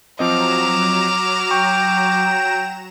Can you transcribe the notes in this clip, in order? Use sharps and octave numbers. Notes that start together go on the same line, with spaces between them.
F3 F#3 C4 D#5 A#5 D6 F6 E7
G5 C#6